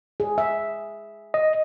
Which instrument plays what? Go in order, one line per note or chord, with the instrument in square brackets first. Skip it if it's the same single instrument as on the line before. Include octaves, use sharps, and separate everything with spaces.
[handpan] G#4
E5
[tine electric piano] D#5